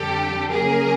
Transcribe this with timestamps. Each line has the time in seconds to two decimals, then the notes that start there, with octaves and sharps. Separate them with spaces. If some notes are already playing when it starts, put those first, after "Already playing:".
Already playing: F2 D3 G3 G4 A4
0.51 C#3 F#3 A#3 G#4 A#4